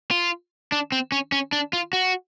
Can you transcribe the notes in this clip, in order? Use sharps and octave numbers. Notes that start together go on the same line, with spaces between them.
F4
D4
C4
C#4
C#4
D4
F4
F#4